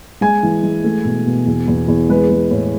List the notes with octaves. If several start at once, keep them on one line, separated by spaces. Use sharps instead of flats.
G#3 G#5
E3
G#3
A3
B2
B2
E2
E2
E2
G#3 B4
G#3
A2